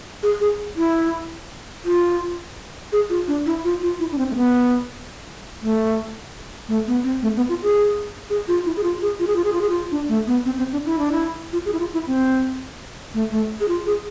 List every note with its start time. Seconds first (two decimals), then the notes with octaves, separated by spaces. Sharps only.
0.23 G#4
0.41 G#4
0.77 E4
1.85 F4
2.92 G#4
3.10 F4
3.28 D4
3.46 E4
3.64 F4
3.82 F4
4.00 E4
4.12 D4
4.18 C4
4.31 A3
4.36 B3
5.62 A3
6.68 A3
6.87 B3
7.04 C4
7.22 A3
7.36 B3
7.49 F4
7.63 G#4
8.30 G#4
8.48 F4
8.66 E4
8.77 G#4
8.83 F4
9.02 G#4
9.19 F4
9.27 G#4
9.36 F4
9.44 G#4
9.53 F4
9.61 G#4
9.69 F4
9.91 D4
10.09 A3
10.27 B3
10.45 C4
10.58 C4
10.72 D4
10.86 E4
10.99 D4
11.12 E4
11.53 F4
11.66 G#4
11.73 E4
11.79 F4
11.94 E4
12.07 C4
13.14 A3
13.31 A3
13.60 G#4
13.68 F4
13.86 G#4